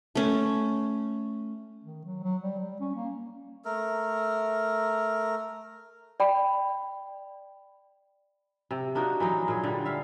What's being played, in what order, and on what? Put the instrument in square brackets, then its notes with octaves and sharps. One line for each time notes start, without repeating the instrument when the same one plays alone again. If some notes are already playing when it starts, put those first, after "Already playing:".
[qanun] A3 C#4
[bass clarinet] D#3
F#3
F#3
G3
G3
C#4
A#3
[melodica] A3 A#4
[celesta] D5 G5 B5
[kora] C3
A#3 D4 D#4 F#4
E3 F#3 D#4
A#2 G#4
D3 G3
E5 F5